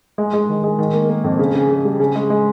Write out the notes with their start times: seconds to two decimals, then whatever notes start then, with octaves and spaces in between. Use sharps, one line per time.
0.18 G#3
0.33 G#3
0.49 D#3
0.64 G#3
0.79 D#3
0.93 A#3
1.10 A#3
1.24 F2
1.39 C#3
1.55 C#3
1.70 C#3
1.85 G3
2.00 C#3
2.15 G#3
2.30 G#3